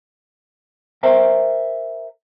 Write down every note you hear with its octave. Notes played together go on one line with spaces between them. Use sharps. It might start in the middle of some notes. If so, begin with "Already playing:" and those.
A#4 C5 E5 G5 A#5